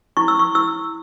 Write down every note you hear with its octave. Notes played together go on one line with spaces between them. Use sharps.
E4 C#6
E6
C#6
E4 E6